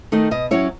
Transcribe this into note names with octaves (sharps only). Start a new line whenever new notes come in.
D#3 A3 D#4
B2 D#5
F#3 C#4 E4 C#5